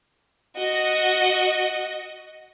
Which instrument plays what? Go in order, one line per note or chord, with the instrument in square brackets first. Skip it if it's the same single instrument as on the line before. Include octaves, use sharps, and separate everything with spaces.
[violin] F#4 D#5